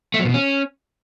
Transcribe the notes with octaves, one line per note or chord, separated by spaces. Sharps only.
A3
F#3
A#2
B2
C#4